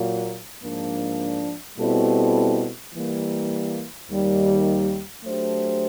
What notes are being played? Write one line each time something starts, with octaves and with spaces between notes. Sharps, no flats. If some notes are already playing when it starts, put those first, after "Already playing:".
Already playing: A#2 F#3 A#3
G#2 F3 A#3 D4
B2 G3 C4 E4 A4
E3 G3 A#3
D#2 D#3 G3
F#3 A3 D4 G4 C5